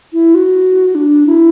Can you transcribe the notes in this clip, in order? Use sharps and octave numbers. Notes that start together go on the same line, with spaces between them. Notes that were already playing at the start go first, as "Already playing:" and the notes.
E4
F#4
D4
E4